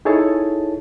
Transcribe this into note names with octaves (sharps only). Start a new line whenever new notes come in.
D#4 E4 G#4 A4 C#5 A5